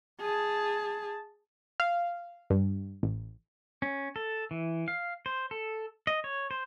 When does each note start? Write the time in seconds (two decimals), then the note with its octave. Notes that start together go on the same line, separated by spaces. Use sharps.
0.20 G#4 A5
1.80 F5
2.50 G2
3.03 A1
3.82 C#4
4.16 A4
4.51 E3
4.88 F5
5.26 C5
5.51 A4
6.07 D#5
6.24 C#5
6.51 C5